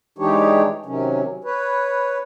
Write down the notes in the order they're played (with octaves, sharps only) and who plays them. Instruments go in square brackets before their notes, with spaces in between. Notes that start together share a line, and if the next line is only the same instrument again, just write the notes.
[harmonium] E3 G#3 D4 D#4 G4 C#5
C3 D#3 F#3 C#4
B4 C#5